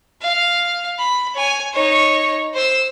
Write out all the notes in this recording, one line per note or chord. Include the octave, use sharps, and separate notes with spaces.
F5
B5
C#5 G#5
D#4 C#5
C5 E6